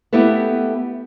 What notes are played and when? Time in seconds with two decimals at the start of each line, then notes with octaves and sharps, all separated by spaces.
0.13 A3 B3 E4 G4 A4 B4